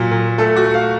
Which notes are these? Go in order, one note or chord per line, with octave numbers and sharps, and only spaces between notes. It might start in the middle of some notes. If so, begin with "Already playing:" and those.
Already playing: A#2 F#3
A#2
A3 A4
F#4
A3
F5